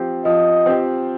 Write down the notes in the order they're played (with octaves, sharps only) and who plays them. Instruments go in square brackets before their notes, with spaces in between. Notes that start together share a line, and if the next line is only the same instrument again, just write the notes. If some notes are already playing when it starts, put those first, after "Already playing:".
Already playing: [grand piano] F3 C4 G4
[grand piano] F3 [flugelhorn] D#5
[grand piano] C4 G4